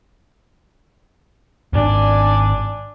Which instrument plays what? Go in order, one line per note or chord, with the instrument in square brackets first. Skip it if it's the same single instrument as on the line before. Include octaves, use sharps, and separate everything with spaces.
[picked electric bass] D#1 G#1 [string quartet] D4 D5 G#5